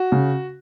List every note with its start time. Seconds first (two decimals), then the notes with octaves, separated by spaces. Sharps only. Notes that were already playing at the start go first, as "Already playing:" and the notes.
Already playing: F#4
0.12 C#3